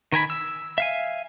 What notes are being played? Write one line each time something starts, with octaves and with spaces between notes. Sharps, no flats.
D#3 A#4 G#5 B5
E6
E5 F5 G#5